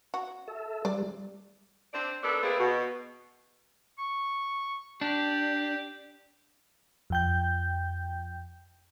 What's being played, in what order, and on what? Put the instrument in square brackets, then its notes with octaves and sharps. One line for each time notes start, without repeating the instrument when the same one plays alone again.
[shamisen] F#4
[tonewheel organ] A4 E5
[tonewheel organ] G3 [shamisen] D5
[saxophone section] C4 D4
D#3 B3 D4 A4
A3 A#3 C4 G#4 B4
B2
[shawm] C#6
[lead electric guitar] D4 [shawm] G4
[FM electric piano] F2 G5 G6